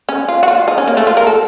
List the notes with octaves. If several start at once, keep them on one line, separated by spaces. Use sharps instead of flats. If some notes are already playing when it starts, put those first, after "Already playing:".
C#4
F4
F#4
F4
D#4
C#4
A#3
A3
F4
A#4
A4